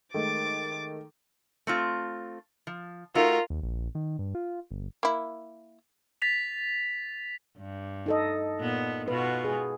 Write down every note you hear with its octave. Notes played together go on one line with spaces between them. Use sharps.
D#3 G#3 A3 D6 A6
A3 C4 F4
F3
A3 D#4 F4 F#4 A#4
D#2
A#1
D#3
G2
F4
G1
A#3 E4
A6 B6 F7
G2
D#4 A4 D#5
A#2 B3
B2 F4 F#4 B4
G#4